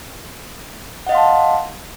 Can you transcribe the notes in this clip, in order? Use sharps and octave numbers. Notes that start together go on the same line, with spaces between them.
D#5 F5 F#5 A5 C6